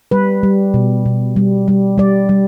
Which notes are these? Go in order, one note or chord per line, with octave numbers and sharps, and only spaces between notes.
G3 B4
G3
B2
B2
G3
G3
G3 D5
G3